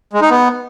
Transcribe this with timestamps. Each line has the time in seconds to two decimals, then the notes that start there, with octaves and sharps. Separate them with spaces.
0.13 G#3
0.22 D#4
0.30 B3